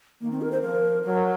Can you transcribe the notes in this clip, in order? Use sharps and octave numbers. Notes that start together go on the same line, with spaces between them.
D#3 A#3
C4
A#4
C5
F3 A#4
F#3 A#4